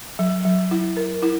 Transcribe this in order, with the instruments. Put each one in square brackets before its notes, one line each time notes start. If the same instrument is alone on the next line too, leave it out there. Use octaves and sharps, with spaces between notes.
[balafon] F#3
F#3
E4
A#4
E4